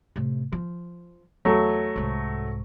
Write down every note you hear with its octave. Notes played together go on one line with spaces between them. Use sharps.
A2 C3
F3
E2 F#3 A3
C2 G#2